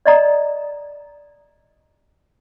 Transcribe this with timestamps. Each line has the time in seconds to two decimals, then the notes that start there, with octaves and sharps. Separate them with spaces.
0.06 D5 D#5 A#5 D#6